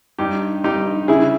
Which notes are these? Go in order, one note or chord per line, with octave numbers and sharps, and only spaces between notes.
G2 D#4 G4
G2 D#4 G4
C#3 E4 G#4